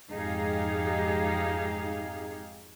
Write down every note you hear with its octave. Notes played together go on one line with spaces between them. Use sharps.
F2 G#2 D#4 G4 G#4 F5